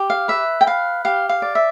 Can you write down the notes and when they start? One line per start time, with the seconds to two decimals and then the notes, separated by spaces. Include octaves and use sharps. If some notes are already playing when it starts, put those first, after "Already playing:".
Already playing: G4
0.10 F5
0.28 B4 E5
0.61 G5
0.67 B4 F5
1.05 G4 F5
1.29 F5
1.42 D5
1.55 E5